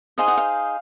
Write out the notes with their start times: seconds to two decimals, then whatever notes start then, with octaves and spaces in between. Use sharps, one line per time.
0.18 D#4 G#4 C5 D#5 F5
0.28 F#5
0.38 F5